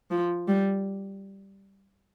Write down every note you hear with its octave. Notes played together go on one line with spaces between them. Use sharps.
F3
G3